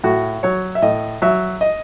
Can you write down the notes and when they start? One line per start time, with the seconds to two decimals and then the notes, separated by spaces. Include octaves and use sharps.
0.04 A2 F#4
0.43 F#3 C#5
0.75 E5
0.82 A2 D#5
1.22 F#3 E5
1.61 D#5